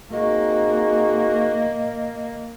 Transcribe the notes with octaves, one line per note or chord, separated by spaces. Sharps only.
A#3 C4 D#4 F#4 G#4 D#5